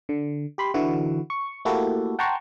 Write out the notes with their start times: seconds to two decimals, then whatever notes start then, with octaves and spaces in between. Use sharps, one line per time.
0.09 D3
0.58 G4 B5 C6
0.74 D3 E3 E4 F#4
1.30 C#6
1.65 A3 A#3 E4 F#4 G4 A4
2.19 F#5 G5 A5 A#5 C6 C#6